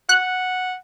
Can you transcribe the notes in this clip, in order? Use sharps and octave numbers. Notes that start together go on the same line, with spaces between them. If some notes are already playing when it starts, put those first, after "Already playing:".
F#5 F#6